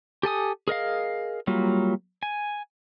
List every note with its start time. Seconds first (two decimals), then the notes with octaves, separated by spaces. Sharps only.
0.23 G4 A4 G#5 D#6
0.68 G#4 A#4 D#5 F5
1.47 F#3 G3 A#3 F4
2.23 G#5